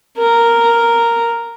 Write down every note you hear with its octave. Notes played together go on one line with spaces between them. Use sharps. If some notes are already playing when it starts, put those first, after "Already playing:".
A#4